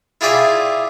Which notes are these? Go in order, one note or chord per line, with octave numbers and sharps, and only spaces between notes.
E4 F4 G#4 D5 E5 G5